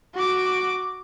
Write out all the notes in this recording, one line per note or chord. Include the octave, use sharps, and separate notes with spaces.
F#4 D6